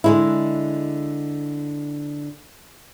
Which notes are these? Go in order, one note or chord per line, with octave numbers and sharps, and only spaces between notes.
D3 G#3 E4